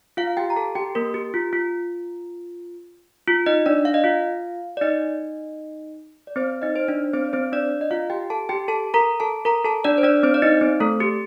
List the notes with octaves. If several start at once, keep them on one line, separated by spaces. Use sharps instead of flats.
F4 F5
F5
G4 G5
A#5
A4 A5
G4 G5
A#3 A#4
G4
F4
F4
F4
D#4 D#5
D4 D5
F5
D#5
F4 F5
D5
D#4 D#5
D5
C4 C5
D#4 D#5
C5
D4 D5
C4 C5
D5
C4 C5
D4 D5
D#5
F4 F5
G4 G5
A4 A5
G4 G5
A4 A5
A#4 A#5
A4 A5
A#4 A#5
A4 A5
D4 D5
C5
D4 D5
C4 C5
D5
D#4 D#5
C4 C5
A3 A4
G4